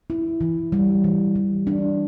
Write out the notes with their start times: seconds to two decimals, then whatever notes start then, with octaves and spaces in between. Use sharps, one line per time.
0.10 E4
0.41 E3
0.72 G3
1.04 E3
1.35 E3
1.67 D4